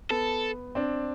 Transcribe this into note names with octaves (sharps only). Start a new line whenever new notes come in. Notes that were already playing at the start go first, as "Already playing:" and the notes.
B3 A4
C4 D4